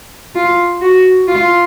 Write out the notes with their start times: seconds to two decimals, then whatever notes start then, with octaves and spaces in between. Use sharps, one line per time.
0.35 F4
0.82 F#4
1.28 F4